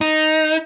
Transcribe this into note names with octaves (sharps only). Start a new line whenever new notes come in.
D#4